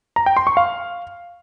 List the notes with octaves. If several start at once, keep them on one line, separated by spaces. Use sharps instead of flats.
A#5
G5
C6
C#6
F5